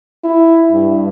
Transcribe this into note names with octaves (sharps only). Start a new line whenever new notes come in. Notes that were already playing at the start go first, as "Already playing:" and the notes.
E4
G2